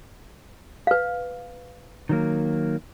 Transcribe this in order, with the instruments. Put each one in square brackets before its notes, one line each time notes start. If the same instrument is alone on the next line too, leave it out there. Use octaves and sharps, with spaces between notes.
[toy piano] B4 F5
[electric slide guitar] D#3 F#3 A#3